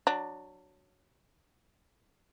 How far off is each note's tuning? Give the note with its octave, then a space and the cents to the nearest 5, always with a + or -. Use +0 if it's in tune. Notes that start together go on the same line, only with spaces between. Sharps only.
F#3 +0 D4 +15